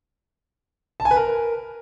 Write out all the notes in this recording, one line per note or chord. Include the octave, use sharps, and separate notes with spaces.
A5
G#5
B4
A#4